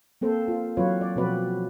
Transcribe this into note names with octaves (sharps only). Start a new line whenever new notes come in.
A#3 C4 A4 C5
F4
E3 F#3 C4 F4 B4 C#5
D5
B2 F3 C4 F#4 B4 D5